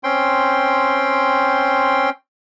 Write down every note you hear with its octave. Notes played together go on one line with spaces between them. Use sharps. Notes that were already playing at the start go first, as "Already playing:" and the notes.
C4 C#4 G5 C6